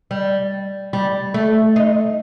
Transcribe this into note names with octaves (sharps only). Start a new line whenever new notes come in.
G3
G3
A3
D#4